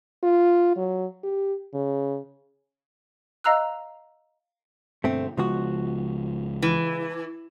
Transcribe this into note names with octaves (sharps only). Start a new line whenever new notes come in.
F4
F#3
G4
C#3
D#5 F5 A#5 E6 F#6
G2 B2 D3 A3 C4
C#2 C#3 F3 G#3 B3 F#4
E3